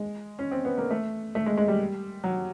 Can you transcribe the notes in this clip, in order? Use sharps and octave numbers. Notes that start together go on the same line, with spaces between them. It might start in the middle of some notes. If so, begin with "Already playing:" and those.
Already playing: G#3
C#4
C4
B3
A#3
A3
A3
G#3
G#3
G3
F#3